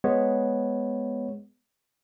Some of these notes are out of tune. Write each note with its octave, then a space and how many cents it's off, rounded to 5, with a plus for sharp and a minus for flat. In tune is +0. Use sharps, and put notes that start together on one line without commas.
G#3 +0 B3 +0 C#5 -5